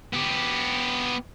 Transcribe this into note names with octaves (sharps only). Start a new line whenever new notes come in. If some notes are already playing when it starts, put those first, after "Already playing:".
B3 G4